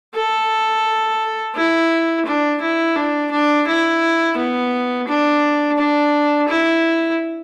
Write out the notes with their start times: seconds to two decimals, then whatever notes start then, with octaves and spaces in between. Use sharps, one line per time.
0.15 A4
1.55 E4
2.26 D4
2.61 E4
2.96 D4
3.31 D4
3.68 E4
4.37 B3
5.08 D4
5.78 D4
6.49 E4